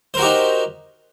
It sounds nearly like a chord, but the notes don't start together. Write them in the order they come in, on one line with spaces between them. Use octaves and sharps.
C5 A#4 F#4 G4 D#4